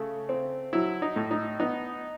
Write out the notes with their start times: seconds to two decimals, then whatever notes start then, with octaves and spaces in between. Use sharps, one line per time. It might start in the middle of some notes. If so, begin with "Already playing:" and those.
Already playing: C#3 A3
0.29 C4
0.73 F#3 E4
1.02 D#4
1.16 A2
1.31 D#4
1.60 B3 D#4